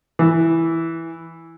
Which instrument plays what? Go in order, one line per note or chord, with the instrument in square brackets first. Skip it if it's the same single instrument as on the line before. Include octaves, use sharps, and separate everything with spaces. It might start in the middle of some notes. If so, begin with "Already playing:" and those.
[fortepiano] E3